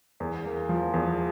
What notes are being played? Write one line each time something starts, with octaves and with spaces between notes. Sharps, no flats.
E2
A#3
F3
E2